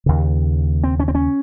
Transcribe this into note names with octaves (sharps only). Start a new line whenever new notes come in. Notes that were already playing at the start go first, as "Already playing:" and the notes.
D#2 C#3
C4
C#4
C4
C#4